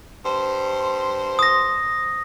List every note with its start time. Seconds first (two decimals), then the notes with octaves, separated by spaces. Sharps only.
0.25 G2 C5
1.39 D#6 A#6